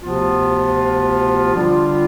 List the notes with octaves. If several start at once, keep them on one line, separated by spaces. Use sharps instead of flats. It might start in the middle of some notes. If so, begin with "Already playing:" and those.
D2 C3 F3 B3 F4
D3 G3 D4 F4